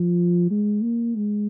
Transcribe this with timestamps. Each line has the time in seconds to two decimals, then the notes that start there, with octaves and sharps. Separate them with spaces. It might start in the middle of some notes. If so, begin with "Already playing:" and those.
Already playing: F3
0.50 G#3
0.83 A#3
1.16 G#3